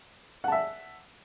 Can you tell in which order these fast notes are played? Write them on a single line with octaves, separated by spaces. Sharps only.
F#5 A5 E5